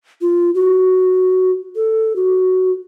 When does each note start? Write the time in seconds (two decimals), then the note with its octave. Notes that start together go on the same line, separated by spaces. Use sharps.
0.21 F4
0.55 F#4
1.76 A4
2.16 F#4